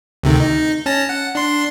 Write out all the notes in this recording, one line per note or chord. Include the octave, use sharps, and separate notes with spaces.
D2 C3 D#3
D#4
C#4 A5 A#6
F#5
D4 C6